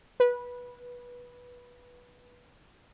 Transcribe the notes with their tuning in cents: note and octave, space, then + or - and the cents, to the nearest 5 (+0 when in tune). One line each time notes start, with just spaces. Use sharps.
B4 -15